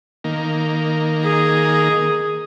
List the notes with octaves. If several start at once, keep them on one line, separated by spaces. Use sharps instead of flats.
D#3 A#3
G#4